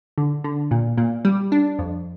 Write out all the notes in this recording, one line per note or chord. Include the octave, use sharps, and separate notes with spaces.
D3
D3
A#2
A#2
G3
D4
F2